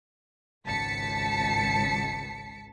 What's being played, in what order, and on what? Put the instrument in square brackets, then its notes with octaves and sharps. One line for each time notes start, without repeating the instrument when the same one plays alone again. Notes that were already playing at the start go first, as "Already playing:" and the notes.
[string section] G#1 C#2 A5 B6 C#7